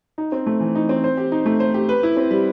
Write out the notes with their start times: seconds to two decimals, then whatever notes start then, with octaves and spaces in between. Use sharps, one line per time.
0.18 D#4
0.32 C4
0.46 A3
0.60 E3
0.75 D#4
0.89 C4
1.04 C5
1.17 G4
1.32 D#4
1.46 A3
1.60 C5
1.74 G4
1.89 B4
2.03 E4
2.17 C4
2.31 G3